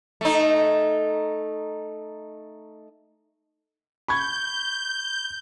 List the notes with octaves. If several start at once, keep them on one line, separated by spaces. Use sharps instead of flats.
A3 D#4
B5 C#6 G6 G#6